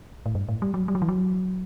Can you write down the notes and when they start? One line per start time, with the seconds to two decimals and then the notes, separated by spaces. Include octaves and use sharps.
0.26 A2
0.35 G2
0.49 A2
0.62 G3
0.74 F#3
0.88 G3
0.95 F#3
1.02 E3
1.09 F#3